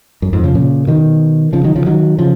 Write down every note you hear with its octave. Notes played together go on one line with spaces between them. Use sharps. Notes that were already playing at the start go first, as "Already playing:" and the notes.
F#2
F2 G#2
C#3 F3
A#2 C#3
B2 D#3
C#3 F3
D#3 F#3
C#3 F3
D#3 F#3
C#3 F3